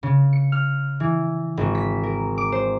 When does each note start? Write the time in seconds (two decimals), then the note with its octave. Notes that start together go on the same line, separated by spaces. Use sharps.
0.03 C#3
0.33 C#7
0.52 F6
1.00 E3
1.57 G#1
1.75 B6
2.03 A#4
2.38 D6
2.52 C5